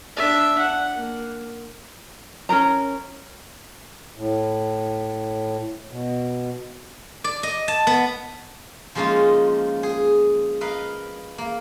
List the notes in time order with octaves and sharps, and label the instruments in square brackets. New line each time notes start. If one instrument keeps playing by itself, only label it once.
[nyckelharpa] D4 E5
F#5
A#3
[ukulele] C#4 G#4 A#4 A#5
[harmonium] A2
B2
[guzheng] D5
D#5
A5
B3
F3 G#3 A#3 C#4 D#4 F4
G#4
A#4 B4 D#5 F5
A#3